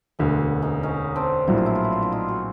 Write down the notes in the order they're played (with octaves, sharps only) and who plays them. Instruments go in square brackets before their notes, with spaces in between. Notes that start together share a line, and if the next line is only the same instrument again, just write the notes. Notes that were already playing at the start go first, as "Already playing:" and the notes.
[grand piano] E1 D2 D3 [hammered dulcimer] B3 C#4
[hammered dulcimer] C#4 D#4
C#4 D#4
C4 D4
[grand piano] A#1 A2 F#3 [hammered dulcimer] E4
[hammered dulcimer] F4
E4
F4
E4
F4
D4 E4
D#4 F4
F#4 G#4